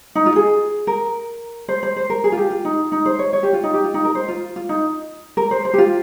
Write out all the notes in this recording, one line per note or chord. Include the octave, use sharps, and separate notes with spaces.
D#4
F4
G#4
A#4
C5
C5
C5
A#4
G#4
F4
G4
F4
D#4
D#4
C5
C#5
C#5
G4
F4
D#4
G4
F4
D#4
A#4
C5
F4
F4
D#4
A#4
C5
C5
G4
F4